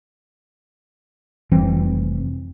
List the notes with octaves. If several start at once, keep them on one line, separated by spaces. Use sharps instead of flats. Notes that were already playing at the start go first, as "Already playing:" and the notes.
F1 E3 G3 C4